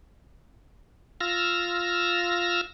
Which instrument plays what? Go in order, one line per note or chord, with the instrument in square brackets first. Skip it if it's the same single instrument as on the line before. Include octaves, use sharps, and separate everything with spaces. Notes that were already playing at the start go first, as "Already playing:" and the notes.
[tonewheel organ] F4 E6 F6 A#6